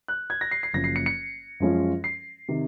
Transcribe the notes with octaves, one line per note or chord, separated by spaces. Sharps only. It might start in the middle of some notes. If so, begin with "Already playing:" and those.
F#6
G#6
A#6
C7
C7
F#1 F#2 F3 A#3 C#4 A#6
C7
C#7
C#7
F#2 F3 G#3 C#4 F4
C7
C3 D#3